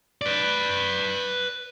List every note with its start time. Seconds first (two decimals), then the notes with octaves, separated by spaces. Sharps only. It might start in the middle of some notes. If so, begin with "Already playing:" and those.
0.22 B4 D5